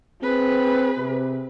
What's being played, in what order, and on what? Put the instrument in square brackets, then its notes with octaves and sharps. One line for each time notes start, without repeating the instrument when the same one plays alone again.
[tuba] C4 [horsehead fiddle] G#4 B4
[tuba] C3